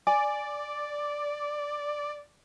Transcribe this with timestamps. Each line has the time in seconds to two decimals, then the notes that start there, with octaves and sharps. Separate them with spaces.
0.07 D5 G#5